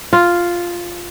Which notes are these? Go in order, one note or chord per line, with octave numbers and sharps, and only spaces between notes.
F4